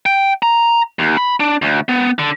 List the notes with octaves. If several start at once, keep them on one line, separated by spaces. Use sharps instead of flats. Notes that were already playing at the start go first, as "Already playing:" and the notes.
G5
A#5
D#2
B5
D4
D2
B3
D3